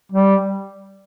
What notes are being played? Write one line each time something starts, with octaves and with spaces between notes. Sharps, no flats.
G3